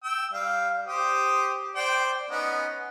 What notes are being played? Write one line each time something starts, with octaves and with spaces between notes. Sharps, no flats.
G5 E6
G3 F5
G4 C5 D#6
C5 D5 G5
B3 C#4 D#4